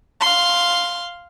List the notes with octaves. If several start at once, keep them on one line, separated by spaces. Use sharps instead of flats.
F5 C6